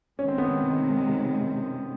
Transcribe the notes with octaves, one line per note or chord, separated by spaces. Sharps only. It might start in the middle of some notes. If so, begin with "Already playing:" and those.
C3 D#3 G#3 C#4
C4
B3
C4